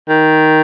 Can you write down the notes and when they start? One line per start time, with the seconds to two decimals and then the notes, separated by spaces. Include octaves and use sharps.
0.09 D#3